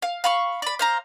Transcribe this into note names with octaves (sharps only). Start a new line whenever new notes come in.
F5
F5 B5 C#6
D5 B5
C5 F5 A#5